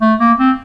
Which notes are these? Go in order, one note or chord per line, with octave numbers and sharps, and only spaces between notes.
A3
A#3
C4